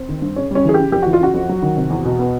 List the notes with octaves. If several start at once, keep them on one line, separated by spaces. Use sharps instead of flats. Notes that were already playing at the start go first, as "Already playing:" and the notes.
Already playing: C4
D#3
G2
C#3 C#4
G3 C#4
E3 G#4
C#3 G4
F2 G4
E3 F#4
F4
C#3 F#4
F2
F#3
D#3
C3
E2
B2
B3